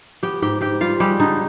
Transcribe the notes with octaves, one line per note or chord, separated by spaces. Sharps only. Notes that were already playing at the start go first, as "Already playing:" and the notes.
B3 G4 G5
G#2 G4 G5
G#2 G4 G5
G3 F4 F5
G3 G#3 G4
D3 D#4